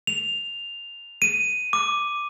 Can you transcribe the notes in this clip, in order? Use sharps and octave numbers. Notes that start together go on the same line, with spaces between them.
F7
D#7
D6